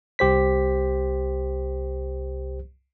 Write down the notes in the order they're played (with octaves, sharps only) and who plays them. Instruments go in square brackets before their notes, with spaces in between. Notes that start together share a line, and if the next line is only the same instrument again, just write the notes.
[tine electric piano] C2 G4 C5 B6